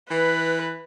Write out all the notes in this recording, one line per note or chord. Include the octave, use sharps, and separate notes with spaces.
E3 B4